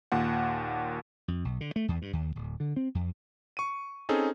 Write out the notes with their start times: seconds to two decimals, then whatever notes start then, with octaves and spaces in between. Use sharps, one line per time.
0.12 D#2 A#2 F#5
1.28 F2
1.45 B1
1.61 D3
1.76 A3
1.88 E2
2.02 G2
2.13 D#2
2.36 D1
2.60 D3
2.76 C4
2.95 F2
3.57 C#6 D#7
4.09 C4 C#4 D#4 G#4 A4